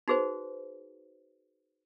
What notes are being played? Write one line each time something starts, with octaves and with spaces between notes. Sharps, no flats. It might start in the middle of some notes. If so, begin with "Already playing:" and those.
D#4 F#4 G#4 B4 C5